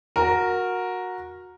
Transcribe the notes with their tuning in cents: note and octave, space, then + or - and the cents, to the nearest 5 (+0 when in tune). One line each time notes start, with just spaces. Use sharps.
F#4 -15 A#4 +0